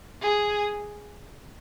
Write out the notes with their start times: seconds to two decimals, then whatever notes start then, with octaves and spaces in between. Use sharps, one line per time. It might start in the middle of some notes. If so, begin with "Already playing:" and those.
0.22 G#4